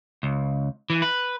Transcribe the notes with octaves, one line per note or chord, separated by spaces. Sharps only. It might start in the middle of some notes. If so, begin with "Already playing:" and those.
C#2
E3
B4